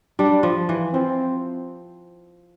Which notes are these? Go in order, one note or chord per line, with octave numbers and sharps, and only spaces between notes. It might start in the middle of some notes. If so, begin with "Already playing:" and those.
G3 D4
F3
E3
F3 C4